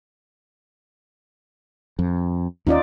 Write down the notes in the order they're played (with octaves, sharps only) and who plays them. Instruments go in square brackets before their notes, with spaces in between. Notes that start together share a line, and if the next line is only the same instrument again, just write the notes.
[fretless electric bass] F2
[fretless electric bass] D#2 C#4 [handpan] D#4 F4 D5